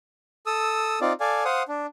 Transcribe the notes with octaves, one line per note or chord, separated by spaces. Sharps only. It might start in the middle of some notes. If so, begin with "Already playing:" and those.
A4 D#6 E6
C4 D#4 F4 D5
A4 D5 F5 G#5
C5 F5 F#5 D#6
D4